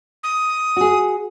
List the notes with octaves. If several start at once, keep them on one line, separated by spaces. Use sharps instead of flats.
D#6
F#4 G#4